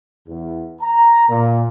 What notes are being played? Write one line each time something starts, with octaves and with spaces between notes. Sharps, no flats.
E2
A#5
A#2